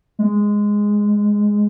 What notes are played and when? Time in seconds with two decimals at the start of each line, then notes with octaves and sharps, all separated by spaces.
0.19 G#3